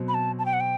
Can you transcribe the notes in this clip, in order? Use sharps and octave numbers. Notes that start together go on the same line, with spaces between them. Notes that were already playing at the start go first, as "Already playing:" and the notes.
Already playing: B2 F#3 C4
B5
A5
A5
G5
F#5
G5